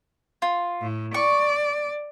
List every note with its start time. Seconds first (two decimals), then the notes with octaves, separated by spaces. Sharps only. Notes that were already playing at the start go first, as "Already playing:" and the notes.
0.42 F4
0.81 A2
1.14 D5 C#6